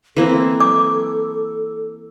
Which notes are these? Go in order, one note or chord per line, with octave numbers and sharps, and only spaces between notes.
E3 A#3 C4 A4
D6